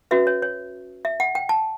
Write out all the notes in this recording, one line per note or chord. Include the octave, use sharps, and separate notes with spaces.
C#4 F#4 B4 E5
C#5
C#5
E5
F#5
G5
A5